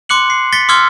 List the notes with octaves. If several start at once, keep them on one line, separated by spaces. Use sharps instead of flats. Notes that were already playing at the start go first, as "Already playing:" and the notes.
C6 D6 F#6 C#7 F#7
C7
A6 B6 C#7 G7
C6 D6 E6 F6 G#6 G7